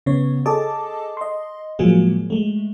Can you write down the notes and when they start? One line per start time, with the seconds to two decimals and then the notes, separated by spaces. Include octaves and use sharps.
0.06 C#3 B3 C#5
0.46 G#4 A4 D#5 A5 D6
1.17 D#5 C6
1.79 A2 F3 F#3 G#3 A#3 G#4
2.30 G#3 A3